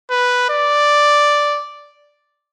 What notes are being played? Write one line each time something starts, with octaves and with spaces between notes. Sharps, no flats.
B4
D5